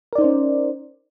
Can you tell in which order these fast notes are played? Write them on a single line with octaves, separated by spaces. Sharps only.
A#4 D5 D#4 C5 C#4